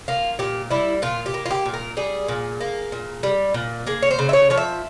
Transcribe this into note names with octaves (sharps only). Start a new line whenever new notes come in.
A#3 F4
A#2 G4
G3 E4
A#2 F4
G4
A#3
F4
G4
A#2
A#4
G3 G#4
A#2
A#3
A#2
G3
A#2
A#3 G#4
C#5
C5
C#3
E5
C#5
F3 C#5
E5